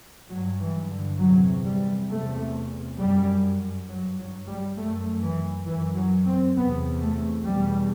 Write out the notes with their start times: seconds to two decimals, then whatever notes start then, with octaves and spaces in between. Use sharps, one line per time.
0.29 G2 F#3
0.60 E3
0.90 D3
1.19 E2 C3 F#3
1.63 G3
2.09 E2 C3 A3
2.98 F#2 G3
3.88 G2 F#3
4.18 F#3
4.47 G3
4.77 F#2 A3
5.22 E3
5.66 F#2 E3
5.96 F#3
6.26 C4
6.56 E2 C3 B3
7.00 A3
7.46 E2 B2 G3